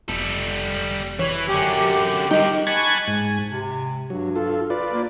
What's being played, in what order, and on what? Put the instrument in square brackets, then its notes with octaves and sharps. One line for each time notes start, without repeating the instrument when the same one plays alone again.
[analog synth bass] F1 [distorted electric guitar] G3 A4
[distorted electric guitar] E3 [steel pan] C#5
[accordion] F#2 G4 [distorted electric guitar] D3 C#4
[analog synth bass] G3 [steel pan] D#4 [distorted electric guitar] F4 G5 [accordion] G4
[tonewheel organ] G#5 A5 B5 C#6 F#6 G#6
G#2 G#5
[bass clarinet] C3
[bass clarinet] G2 [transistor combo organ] F#3
[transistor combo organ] F4 A4
F4 B4 D5
[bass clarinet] A#3